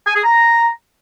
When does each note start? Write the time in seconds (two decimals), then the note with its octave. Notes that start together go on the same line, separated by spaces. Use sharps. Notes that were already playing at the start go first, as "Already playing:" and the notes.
0.06 G#5
0.15 G#4
0.24 A#5